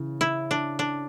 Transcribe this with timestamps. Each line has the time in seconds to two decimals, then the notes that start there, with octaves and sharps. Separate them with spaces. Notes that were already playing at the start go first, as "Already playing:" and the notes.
Already playing: C#3 E3
0.21 E4
0.51 D4
0.79 D4